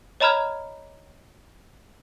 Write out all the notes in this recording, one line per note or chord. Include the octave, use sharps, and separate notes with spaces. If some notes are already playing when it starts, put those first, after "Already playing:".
C#5 D#5 A#5 B5 F6 G#6